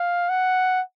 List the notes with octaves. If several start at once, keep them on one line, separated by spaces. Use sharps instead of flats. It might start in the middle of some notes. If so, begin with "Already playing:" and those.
Already playing: F5
F#5